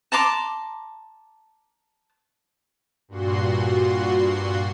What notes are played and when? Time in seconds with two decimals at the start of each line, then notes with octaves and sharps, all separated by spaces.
0.12 A5 A#5 C6 D6
3.08 G2 A#2 F#4 C6